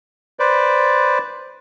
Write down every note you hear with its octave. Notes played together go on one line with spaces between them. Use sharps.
B4 C5 D5